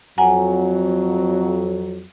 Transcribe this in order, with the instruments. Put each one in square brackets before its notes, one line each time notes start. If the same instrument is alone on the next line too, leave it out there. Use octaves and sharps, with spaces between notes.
[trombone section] F2 F#3 [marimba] F#5 G#5 A#5